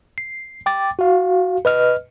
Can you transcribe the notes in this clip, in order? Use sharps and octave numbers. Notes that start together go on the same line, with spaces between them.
C7
G5 D6 A6
F#4 F5
B4 D#5 F6